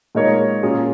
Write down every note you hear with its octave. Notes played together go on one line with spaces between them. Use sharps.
A#2 G#3 D#4 A#4 C#5
A#2 A#3 C#4 F4 G#4